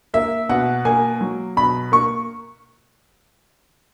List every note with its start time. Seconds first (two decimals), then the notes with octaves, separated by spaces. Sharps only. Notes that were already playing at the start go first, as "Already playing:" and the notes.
0.14 A#3 E5
0.49 B2 F#5
0.85 A#3 G#5
1.21 F#3
1.57 B2 B5
1.92 A#3 C#6